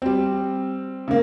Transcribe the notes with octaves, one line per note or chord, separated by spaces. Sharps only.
G3 C4
C#3 A#3